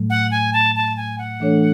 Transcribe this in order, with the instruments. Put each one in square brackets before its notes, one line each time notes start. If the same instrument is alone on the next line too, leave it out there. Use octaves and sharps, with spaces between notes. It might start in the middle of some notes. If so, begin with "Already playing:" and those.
Already playing: [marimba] A2 F#3 A3
[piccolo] F#5
G#5
A5
A5
G#5
F#5
[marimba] E3 A3 D4 A4 C#5